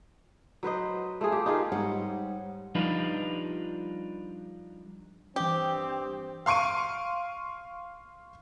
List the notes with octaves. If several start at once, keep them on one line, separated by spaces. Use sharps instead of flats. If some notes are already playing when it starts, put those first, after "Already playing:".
F#3 B4 C5 D#5
A3 F4 G#4
G4
D#4 F4 G#4 A#4
G#2 G3 D#4 G4 C#5 F#5
F3 G3 D4 D#4 F4 B4
G2 E3 C4 G4 D#6
F5 C6 C#6 D7 D#7